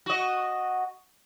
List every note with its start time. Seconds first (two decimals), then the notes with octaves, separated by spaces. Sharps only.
0.06 F#4 D#5